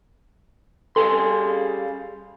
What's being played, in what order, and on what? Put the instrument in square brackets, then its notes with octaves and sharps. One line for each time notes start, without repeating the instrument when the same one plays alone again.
[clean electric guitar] G3 G#5 C6 [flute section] C#4 G#4 F5 [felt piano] A4